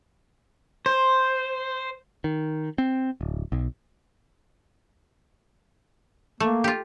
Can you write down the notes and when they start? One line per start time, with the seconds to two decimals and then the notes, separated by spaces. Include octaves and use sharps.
0.86 C5
2.24 D#3
2.78 C4
3.21 D1
3.52 B1
6.40 A3 A#3
6.64 F4 G4